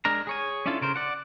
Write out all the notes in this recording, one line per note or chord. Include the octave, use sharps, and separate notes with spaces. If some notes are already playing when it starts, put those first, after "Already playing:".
G#3 D4 A#4 A#5
G#4 C#5 G#5
C#4 D4 E4 F4 A4
C#3 A#4 C5
D5 F#5